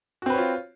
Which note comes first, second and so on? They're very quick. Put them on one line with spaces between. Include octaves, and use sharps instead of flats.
F#4 C4 B4 C#5 F4